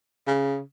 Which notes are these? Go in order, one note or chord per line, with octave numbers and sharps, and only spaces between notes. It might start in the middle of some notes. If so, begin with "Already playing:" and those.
C#3